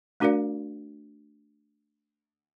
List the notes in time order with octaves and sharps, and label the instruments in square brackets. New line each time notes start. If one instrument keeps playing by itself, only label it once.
[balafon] A3 D4 F#4 A#4 D5 F5